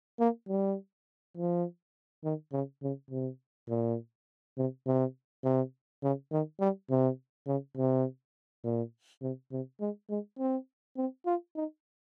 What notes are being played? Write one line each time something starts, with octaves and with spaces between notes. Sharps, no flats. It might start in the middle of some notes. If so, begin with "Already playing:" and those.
A#3
G3
F3
D#3
C#3
C#3
C3
A#2
C3
C3
C3
C#3
D#3
G3
C3
C#3
C3
A#2
C3
C3
G#3
G#3
C4
C4
F4
D#4